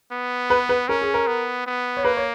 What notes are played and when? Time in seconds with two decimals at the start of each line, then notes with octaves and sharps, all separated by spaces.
0.12 B3
0.50 B4
0.69 B4
0.88 C#4 A#4
1.02 G#4
1.14 A#4
1.27 B3
1.66 B3
1.97 C#5
2.04 A#3 B4
2.17 C#5